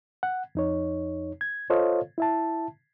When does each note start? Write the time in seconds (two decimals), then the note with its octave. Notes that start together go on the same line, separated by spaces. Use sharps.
0.23 F#5
0.55 F2 D#4 C#5
1.41 G#6
1.70 F4 A4 C5 C#5 D#5 F5
2.18 E4 E5 A5